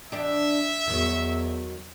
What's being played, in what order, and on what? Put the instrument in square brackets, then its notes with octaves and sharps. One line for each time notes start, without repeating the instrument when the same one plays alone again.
[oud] E2 D4 G4 [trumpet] E5
[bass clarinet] E2 [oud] D#3 F#3